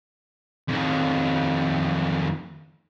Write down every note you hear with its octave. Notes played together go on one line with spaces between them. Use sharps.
F2 D#3